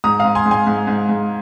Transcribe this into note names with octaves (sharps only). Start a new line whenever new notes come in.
G#2 A#5 D#6
G#2 F5 A#5
G#5 C6
G#2
G#5 C6
G#2
G#2
G#2